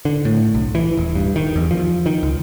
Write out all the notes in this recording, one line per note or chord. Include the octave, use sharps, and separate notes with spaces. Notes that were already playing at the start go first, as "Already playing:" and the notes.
D3
A2
B1
E3
D#1
G2
D#3
E2
F3
D#3
C#2